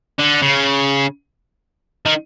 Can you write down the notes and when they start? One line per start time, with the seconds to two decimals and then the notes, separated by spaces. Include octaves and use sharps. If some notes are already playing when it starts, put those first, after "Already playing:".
0.19 D3
0.42 C#3
2.06 D#3